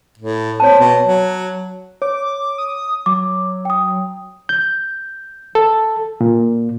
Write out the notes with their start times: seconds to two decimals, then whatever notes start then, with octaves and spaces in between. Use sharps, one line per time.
0.18 A2
0.60 C4 C#5 A5
0.79 B2
1.03 F#3
2.02 C#5 D6
2.58 D#6
3.06 F#3 D6
3.65 G5 D#6
4.49 G6
5.55 A4
6.21 A#2